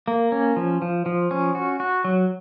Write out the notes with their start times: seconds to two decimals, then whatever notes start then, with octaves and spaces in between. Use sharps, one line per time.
0.08 A#3
0.32 C#4
0.57 F3
0.82 F3
1.06 F3
1.31 C#4
1.55 F#4
1.80 F#4
2.04 F#3